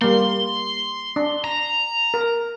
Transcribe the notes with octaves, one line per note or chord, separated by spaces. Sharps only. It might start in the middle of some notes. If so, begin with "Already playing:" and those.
G3 A#3 C6
D4
A#5
A#4